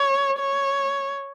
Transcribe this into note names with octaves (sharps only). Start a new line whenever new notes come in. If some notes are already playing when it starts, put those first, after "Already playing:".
Already playing: C#5
C#5